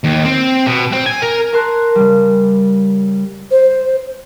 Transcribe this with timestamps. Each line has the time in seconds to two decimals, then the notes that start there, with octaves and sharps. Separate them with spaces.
0.04 D#2
0.25 C4
0.67 B2
0.92 C4
1.06 G#5
1.22 A#4
1.52 A#4 A5 C6 F#6
1.95 C#3 G3
3.51 C5